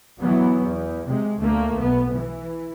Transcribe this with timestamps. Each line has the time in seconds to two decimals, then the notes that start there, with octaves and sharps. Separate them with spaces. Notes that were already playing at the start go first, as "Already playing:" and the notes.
0.21 E3 F#3 B3
0.61 E2
1.06 C3 G#3
1.38 D2 A3 A#3
1.77 B1 B3
2.14 E3